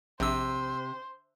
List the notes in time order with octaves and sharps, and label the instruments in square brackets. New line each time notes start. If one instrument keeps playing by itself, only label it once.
[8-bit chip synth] A#1 E6 [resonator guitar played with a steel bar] C3 [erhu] C5